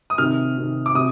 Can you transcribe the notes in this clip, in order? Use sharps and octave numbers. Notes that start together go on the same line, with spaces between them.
D#6
C3 D#3 F6
C3 D#3
D6
C3 D#6